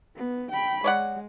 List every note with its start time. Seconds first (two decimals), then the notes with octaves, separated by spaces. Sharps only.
0.16 B3
0.51 G5 B5
0.84 G#3 C#5 D5 F#5